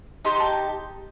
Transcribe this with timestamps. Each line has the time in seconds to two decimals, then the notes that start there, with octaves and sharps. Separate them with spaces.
0.25 D#4 G4 C6
0.40 A5